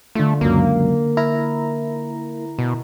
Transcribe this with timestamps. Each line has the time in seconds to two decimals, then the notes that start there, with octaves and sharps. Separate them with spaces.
0.15 D3 A3 D4 F4
0.41 C#2 F#2 A#3
1.17 E4 A#4 A#5
2.59 B2